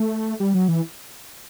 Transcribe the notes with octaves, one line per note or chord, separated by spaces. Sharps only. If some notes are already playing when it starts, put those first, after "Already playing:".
Already playing: A3
G3
F#3
E3